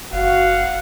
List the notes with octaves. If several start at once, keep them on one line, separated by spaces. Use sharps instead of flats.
F#1 F#4 F5 F#5